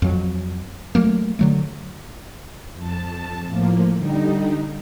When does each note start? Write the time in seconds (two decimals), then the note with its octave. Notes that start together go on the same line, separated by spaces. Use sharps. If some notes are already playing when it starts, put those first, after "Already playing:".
0.02 F2 F#3
0.95 F#3 A3 A#3
1.39 D3 F#3 A3
2.74 F2 A5
3.47 A2 F3 A#3
3.96 D3 G3 D#4